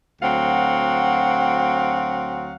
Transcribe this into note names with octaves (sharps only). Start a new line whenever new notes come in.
D2 F#3 C4 F5 F#5